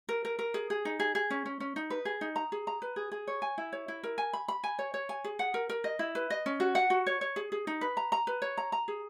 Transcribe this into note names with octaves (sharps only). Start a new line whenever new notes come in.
A#4
A#4
A#4
G#4
G#4
D#4
G#4
G#4
C#4
C#4
C#4
D#4
B4
G#4
D#4
A#5
G#4
A#5
B4
G#4
G#4
C#5
G#5
E4
C#5
E4
A#4
G#5
B5
B5
G#5
C#5
C#5
G#5
G#4
F#5
A#4
A#4
D#5
E4
B4
D#5
C#4
F#4
F#5
F#4
C#5
C#5
G#4
G#4
D#4
B4
A#5
A#5
B4
C#5
A#5
A#5
G#4